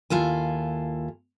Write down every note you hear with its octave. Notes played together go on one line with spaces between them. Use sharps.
D#2 E4 F4 A4 G#5